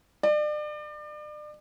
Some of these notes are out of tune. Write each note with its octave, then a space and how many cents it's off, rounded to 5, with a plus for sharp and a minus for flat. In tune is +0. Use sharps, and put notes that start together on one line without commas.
D5 +35